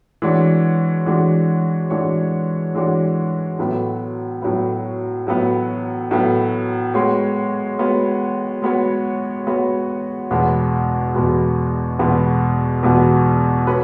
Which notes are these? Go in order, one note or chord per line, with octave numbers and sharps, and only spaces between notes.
E3 G#3 D4 F#4 C#5
E3 G#3 D4 F#4 C#5
E3 G#3 D4 F#4 C#5
E3 G#3 D4 F#4 C#5
A2 F#3 B3
A2 F#3 B3
A2 F#3 B3
A2 F#3 B3
G#3 B3 F#4 C#5
G#3 B3 F#4 C#5
G#3 B3 F#4 C#5
G#3 B3 F#4 C#5
E2 B2 G#3 B3 F#4
E2 B2 G#3 B3 F#4
E2 B2 G#3 B3 F#4
E2 B2 G#3 B3 F#4
C#4 F#4 B4